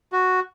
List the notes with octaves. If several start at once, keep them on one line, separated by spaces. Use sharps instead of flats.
F#4